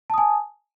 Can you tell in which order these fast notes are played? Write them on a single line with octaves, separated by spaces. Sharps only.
A5 D#6 G#5